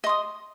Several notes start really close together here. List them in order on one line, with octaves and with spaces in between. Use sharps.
D#5 C6 D#6